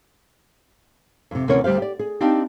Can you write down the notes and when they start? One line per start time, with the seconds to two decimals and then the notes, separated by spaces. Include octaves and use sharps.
1.31 F2 C3
1.48 D2 C3 E3 C#4 A#4 C#5
1.64 D2 G3 G4 C5 F5
1.78 G4 D5
1.99 G#4
2.20 C4 D4 D#4 G4 F5 A5